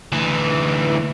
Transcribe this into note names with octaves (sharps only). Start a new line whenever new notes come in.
D2 E3